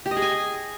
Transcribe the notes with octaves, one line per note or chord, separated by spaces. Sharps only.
G4
D#5
G#4
G#5